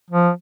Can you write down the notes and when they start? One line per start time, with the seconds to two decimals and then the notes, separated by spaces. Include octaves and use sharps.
0.10 F3